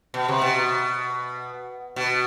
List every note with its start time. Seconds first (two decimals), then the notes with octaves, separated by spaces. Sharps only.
0.14 B2
0.28 C3
0.41 B2
1.96 B2